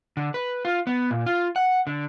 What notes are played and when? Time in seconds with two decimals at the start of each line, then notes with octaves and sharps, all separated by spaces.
0.17 D3
0.34 B4
0.65 F4
0.87 B3
1.11 A#2
1.26 F4
1.56 F#5
1.87 D3